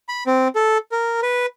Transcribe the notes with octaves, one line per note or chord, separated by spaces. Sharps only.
B5
C4
A4
A#4
B4